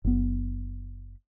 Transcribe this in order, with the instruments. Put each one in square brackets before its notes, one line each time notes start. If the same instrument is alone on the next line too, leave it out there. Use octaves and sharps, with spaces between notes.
[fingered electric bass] F#1 B3